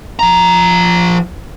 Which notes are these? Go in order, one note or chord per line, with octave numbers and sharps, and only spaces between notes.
F3 A#5